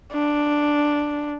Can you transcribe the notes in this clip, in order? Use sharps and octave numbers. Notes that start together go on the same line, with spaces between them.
D4